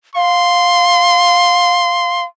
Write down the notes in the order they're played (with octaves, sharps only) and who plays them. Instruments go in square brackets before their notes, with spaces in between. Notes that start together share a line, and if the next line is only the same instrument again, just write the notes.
[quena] F5 [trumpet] C6